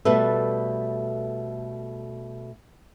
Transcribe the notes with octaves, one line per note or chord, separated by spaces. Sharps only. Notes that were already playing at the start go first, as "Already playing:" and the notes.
B2 G3 A3 A4 B4 E5